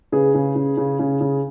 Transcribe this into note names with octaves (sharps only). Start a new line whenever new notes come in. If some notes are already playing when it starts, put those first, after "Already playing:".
C#3 G#4 B4
C#3
C#3
C#3
C#3
C#3